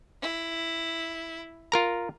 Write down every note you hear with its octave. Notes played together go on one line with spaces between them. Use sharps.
E4
F4 A#4 A#5